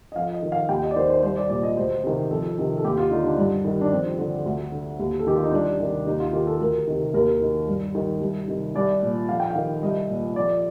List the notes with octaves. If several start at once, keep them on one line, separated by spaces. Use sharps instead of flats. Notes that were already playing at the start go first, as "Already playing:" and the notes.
D#5
F2 F5
D#5
D#3
F5
D#2 G5
D#5
D5
D#3 C5
C5
C2 C5
D5
A#2 D5
D#5
D2 C5
C3 D#3
F2 A4
C3 D#3
A4
D#2 G4
F4
D3 D#4
D4
G2
D#3
D4
F2 C4
D3
D2
D3
D#2
A4
D#3 G4
F4
D#4
C2 D4
C3 D#3
D#2 D#4
F4
D#3 G4
A4
D2 A#4
C3 D#3
D#2 A#4
D#3
G2
D#3
C2
C3 D#3
C2 D5
A#2
F2 F5
G5
F5
D#3
C2 D#5
A#2
F2 D5